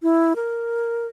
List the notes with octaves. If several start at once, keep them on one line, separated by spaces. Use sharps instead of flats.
E4
A#4